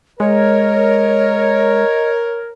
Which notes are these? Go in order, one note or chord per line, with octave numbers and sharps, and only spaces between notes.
G#3 A#4 C#5 D#5